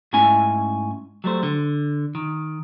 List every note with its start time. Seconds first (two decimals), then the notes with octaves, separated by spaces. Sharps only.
0.13 G#2 A3 C#4 E4 G#5
1.24 F#3 G3 A3 C5
1.43 D3
2.15 D#3